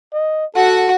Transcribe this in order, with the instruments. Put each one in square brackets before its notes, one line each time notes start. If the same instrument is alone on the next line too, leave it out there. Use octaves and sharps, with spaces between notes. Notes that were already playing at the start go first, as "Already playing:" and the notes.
[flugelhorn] D#5
[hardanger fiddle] F#4 F#5 [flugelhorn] A4